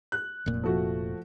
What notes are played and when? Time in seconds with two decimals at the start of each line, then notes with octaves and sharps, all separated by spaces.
0.12 F#6
0.46 F1 A#2
0.64 F3 A3 F#4